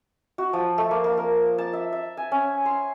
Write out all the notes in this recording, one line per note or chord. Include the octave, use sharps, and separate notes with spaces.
F#4
F3
A3
A#3
A#3
A#4
A5
E5
E5
G#5
C#4
C6